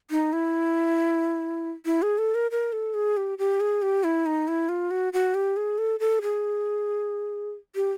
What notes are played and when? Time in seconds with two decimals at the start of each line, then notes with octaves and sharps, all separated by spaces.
0.11 D#4
0.33 E4
1.86 E4
2.02 G#4
2.18 A4
2.35 A#4
2.51 A#4
2.72 A4
2.94 G#4
3.17 G4
3.38 G4
3.60 G#4
3.82 G4
4.04 E4
4.26 D#4
4.48 E4
4.69 F4
4.91 F#4
5.13 F#4
5.35 G4
5.57 G#4
5.78 A4
6.00 A4
6.22 G#4
7.75 G4